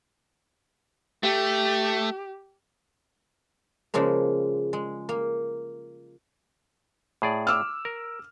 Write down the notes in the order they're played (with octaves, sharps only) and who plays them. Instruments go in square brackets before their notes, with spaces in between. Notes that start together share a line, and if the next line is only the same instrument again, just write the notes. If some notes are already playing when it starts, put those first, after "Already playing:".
[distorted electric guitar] A3 [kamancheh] G4
[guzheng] C#3 F3 G#3 A#3
G#3
A#3
[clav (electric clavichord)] A2 G#4 D5
[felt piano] D6 E6 F6
[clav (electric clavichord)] A#4